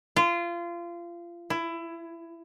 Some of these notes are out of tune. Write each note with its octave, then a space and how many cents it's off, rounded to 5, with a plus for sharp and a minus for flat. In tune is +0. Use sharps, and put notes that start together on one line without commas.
F4 -25
E4 +20